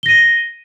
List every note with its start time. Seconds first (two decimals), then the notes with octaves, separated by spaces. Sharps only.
0.03 G7
0.06 A#6
0.09 D#7